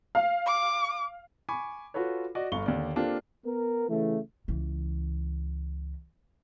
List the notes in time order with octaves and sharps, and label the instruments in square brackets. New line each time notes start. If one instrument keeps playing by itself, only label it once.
[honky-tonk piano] F5
[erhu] D6
[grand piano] G#5 B5 C#6 D6
F4 F#4 A4 B4 C#5
F#4 D5 D#5
G1 A4 F5 C#6 G7
D#2 D3 D5
A#3 C4 D4 F4 G4 A4
[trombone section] B3 A#4
C#3 E3 A3
[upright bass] C#2 E3